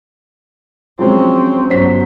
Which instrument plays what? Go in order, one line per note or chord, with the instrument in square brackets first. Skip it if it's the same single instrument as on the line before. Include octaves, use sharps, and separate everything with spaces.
[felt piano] F3 F#3 G#3 [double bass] C4 C#4
[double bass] G1 F#3 [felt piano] C#4 C5 B6